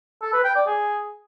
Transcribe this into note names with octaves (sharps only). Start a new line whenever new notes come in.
A4
B4
G5
D5
G#4